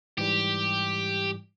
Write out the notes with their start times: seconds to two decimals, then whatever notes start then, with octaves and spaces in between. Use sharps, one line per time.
0.18 G#2 E3 G3 G4